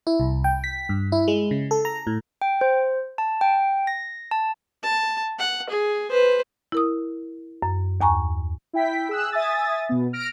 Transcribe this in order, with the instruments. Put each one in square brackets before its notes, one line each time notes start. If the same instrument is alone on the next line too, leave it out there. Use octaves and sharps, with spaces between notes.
[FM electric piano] E4
C2
G5
B6
G2
E4
G#3
C#3
A4
A#5
A2
[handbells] G5
C5
A5
G5
A#6
A5
[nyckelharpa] A5
F#5
G#4
B4 C5
[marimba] E4 A#4 D#6
F#2
D#2 G#5 A#5 C#6
[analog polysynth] E4 G5 B6
G#4 E6 F#6
E5 G#5 D#6 A6
B2 B3
F6 A#6 D7